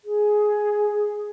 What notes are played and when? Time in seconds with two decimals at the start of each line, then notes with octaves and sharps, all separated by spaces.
0.04 G#4